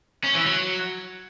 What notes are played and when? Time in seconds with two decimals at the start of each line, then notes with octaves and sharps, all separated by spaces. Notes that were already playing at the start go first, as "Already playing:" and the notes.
0.24 C#4
0.35 E3
0.46 F#3